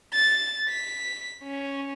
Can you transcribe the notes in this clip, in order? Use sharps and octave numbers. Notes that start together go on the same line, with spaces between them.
A6
B6
C#4